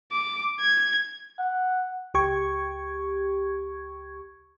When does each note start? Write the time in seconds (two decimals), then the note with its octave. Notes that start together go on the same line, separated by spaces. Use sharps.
0.12 D6
0.60 G#6
1.39 F#5
2.14 C#2 G4 C#6 G#6